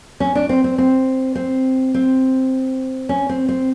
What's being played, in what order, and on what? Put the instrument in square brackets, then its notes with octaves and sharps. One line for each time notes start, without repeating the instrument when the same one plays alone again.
[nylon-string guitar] C#4
D4
C4
C4
C4
C4
C4
C#4
C4
C4